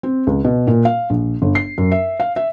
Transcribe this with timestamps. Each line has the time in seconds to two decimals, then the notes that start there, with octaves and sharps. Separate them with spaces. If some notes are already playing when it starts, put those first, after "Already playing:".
0.03 C4
0.27 C#2
0.45 B2
0.67 A#2
0.85 F5
1.10 A#1
1.42 G1
1.55 C7
1.78 F#2
1.92 E5
2.20 F5
2.36 E5